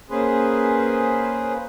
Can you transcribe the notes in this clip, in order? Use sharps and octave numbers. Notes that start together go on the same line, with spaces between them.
A#3 C#4 G#4 B4 C5